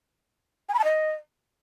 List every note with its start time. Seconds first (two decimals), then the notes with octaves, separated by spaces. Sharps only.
0.69 G#5
0.74 B5
0.79 A5
0.84 D#5